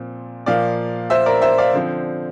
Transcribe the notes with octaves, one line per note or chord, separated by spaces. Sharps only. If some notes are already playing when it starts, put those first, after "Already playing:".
Already playing: A#2 F3 C4
A#2 F3 A#3 D5 F5
C5 E5
A#4 D5
C5 E5
D5 F5
D3 F3 C4